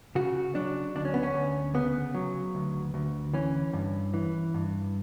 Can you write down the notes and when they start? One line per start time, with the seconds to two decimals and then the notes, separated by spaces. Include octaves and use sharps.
0.15 C#3 F#4
0.55 F#3 D4
0.95 D2 D4
1.05 C#4
1.14 B3
1.23 C#4
1.34 D2
1.74 C#3 B3
2.14 F#3
2.55 D2
2.94 D2
3.33 E3 C#4
3.73 G2
4.14 E3
4.54 G2